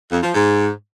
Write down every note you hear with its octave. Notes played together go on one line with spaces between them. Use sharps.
F2
F3
G#2